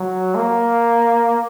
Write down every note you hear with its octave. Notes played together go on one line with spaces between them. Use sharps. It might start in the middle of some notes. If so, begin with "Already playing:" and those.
Already playing: F#3
A#3